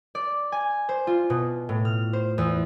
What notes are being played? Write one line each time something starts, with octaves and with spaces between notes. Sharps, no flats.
D5
G#5
C5
F4
B2
A2
F6
C5
E2